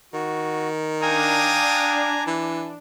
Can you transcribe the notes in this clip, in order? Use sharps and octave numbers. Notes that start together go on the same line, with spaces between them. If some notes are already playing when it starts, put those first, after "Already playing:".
D#3 F#4
D4 F5 G5 G#5 A#5 D#6
E3